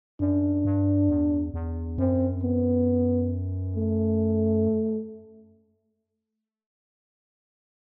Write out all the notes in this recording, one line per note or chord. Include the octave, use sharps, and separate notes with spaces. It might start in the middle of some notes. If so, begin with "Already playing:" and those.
F#2 D4
G2
E2
E2
F#2 C4
B3
A3